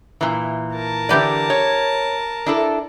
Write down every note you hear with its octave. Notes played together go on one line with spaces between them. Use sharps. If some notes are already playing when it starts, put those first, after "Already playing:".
A#2 E3
A#4 A5
D3 E3 G4 B4 D5
C#5
D4 E4 A4